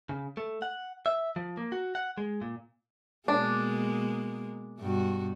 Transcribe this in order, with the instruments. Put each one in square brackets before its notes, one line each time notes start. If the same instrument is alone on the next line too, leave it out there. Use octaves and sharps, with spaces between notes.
[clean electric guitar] C#3
A3
F#5
E5
F3
A#3
F#4
F#5
G#3
A#2
[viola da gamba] B2 G#3 A#3 [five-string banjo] D4
[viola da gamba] G2 B2 F#4